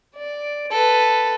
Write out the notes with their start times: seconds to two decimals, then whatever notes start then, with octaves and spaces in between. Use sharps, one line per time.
0.15 D5
0.72 A4 B4